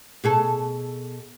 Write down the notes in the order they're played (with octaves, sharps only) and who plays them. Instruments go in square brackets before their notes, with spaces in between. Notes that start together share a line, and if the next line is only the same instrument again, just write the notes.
[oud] B2 G#4 A4